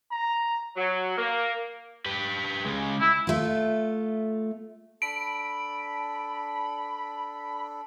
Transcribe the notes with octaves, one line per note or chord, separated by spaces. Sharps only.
A#5
F#3
A#3
G4 B4
C#3 G#3
E4
A3 F4
D4 A4 B5 D7